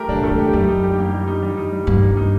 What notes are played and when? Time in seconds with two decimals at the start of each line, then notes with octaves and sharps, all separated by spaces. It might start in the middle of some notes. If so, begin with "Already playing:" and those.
Already playing: A3 G4 A#4
0.08 A#2 D4
0.23 D#3 A3
0.31 D3
0.39 G4
0.53 F#2 G3
0.68 D#4
0.83 G4
0.98 A#3
1.13 G3
1.28 D#4
1.43 G3
1.58 D#4
1.72 G3
1.87 G2 A#3
2.02 G3
2.17 D#4